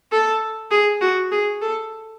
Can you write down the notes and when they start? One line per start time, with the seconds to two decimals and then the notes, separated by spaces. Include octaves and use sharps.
0.12 A4
0.71 G#4
1.01 F#4
1.31 G#4
1.62 A4